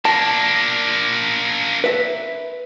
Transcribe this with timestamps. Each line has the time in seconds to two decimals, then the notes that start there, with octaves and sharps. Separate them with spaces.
0.05 A#3 D4 A5
1.84 B4 E5